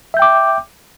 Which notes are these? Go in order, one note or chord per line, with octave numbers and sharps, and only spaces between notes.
E5 G5 D6 G6